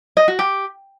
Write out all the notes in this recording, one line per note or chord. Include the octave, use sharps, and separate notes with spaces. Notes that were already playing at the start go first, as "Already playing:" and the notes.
D#5
F#4
G4